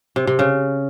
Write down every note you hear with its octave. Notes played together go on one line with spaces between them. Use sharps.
C3
C3
C#3